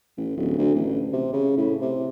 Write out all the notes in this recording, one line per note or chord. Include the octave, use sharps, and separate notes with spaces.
A1
D1
D2
A1
C3
C#3
A2
C3